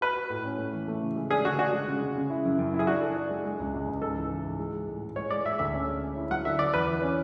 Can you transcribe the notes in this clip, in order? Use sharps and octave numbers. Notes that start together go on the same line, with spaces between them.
F#4 B4
F#4
A2
C#4
A3
E3
A3
C#3
G#3
D4 G#4
D3 F#4
D4 F#4
G#3
C#3
C#3
C#3
E4
F#2
F#2
E4
G#4
D4 F#4
A4
D4
G#3
G#3
C#2
C#2
C#2
G#2 A4
E3
E3
G#2
G#3
G#3
A2
G#3
G#3 C#5
G#3 D5
G#3 E5
D2 E5
C#4
G#3
C#4
E4
F#3 F#5
D3 E5
D3 D5
E2 B4
E3
C#4